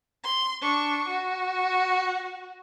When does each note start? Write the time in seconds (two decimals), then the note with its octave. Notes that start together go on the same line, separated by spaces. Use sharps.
0.24 C6
0.61 D4 C#6
1.08 F#4